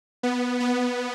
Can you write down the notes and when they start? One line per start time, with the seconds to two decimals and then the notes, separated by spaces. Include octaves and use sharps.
0.23 B3
0.60 B3